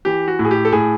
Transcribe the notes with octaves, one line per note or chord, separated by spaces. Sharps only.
E3 G4
F#4
A2
G#4
G4
A4
A2 G#4